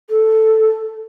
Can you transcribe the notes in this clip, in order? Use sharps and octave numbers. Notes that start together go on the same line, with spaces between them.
A4